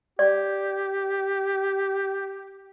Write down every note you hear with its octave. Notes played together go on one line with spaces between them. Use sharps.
G4 D5